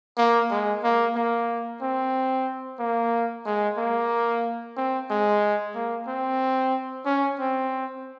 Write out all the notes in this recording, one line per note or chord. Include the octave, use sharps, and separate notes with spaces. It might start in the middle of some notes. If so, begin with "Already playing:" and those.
A#3
G#3
A#3
A#3
C4
A#3
G#3
A#3
C4
G#3
A#3
C4
C#4
C4